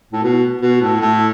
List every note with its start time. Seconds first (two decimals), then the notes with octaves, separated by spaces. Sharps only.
0.13 A2
0.23 B2
0.62 B2
0.81 A2
1.00 A2